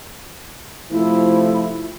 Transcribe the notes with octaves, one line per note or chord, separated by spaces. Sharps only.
C3 F3 A3 E4